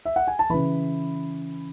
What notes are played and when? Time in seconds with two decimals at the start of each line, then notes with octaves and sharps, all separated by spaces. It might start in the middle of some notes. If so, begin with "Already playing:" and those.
0.06 E5
0.16 F#5
0.28 G#5
0.39 A5
0.50 C#3 E3 B4 B5